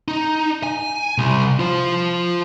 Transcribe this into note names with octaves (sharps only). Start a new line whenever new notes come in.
D#4
G#5
C2
F4 C5